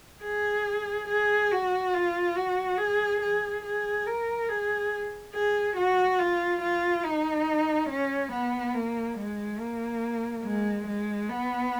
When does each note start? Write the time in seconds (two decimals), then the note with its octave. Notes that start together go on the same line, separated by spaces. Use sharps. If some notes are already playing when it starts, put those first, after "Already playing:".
0.23 G#4
1.08 G#4
1.51 F#4
1.94 F4
2.36 F#4
2.78 G#4
3.21 G#4
3.64 G#4
4.06 A#4
4.49 G#4
5.34 G#4
5.76 F#4
6.19 F4
6.61 F4
7.04 D#4
7.89 C#4
8.32 B3
8.74 A#3
9.17 G#3
9.60 A#3
10.44 G#3
10.87 G#3
11.29 B3